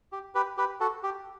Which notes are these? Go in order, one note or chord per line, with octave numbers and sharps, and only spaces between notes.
G4
G4 B4
G4 B4
F#4 A4
G4